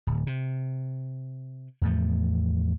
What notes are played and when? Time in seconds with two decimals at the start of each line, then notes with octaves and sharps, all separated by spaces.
0.07 D1
0.27 C3
1.81 E2 A2 F3 A3